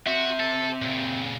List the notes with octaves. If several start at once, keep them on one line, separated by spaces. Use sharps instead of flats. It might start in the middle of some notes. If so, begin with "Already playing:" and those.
C4 F#4 E5
A4
A#2 C#3